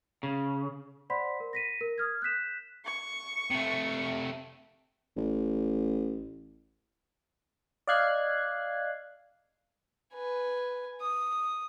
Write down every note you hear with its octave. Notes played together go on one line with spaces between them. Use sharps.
C#3
C5 D5 F#5 B5 C6 B6
A#4
A#6 B6 D#7
A#4
D#6 F6 G#6
F#6 G6 B6 E7
C#6
C3 A3
A1
D5 D#5 F5 F#6 G#6 C7
B4 G#5
D#6